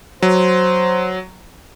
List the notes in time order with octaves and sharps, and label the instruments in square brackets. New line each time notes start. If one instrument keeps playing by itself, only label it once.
[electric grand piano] F#3 [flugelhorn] C5